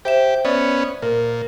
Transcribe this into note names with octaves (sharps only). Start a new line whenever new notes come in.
G4 C5 E5 E7
B3 C#4 D5
A#2 A#4